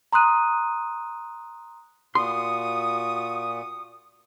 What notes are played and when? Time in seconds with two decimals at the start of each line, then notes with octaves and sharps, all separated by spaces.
0.13 A#5 C6 D#6 F#6 D#7
2.15 A#2 F#4 C6 C#6 D#6